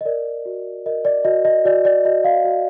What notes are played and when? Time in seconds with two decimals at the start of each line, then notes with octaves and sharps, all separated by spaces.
0.01 D#5
0.05 A#4 D5
0.46 F#4
0.86 A#4 D#5
1.05 D5
1.25 F#4 D#5
1.45 D#5
1.65 F#4 D5
1.85 D5
2.05 F#4 D#5
2.24 F5
2.45 F#4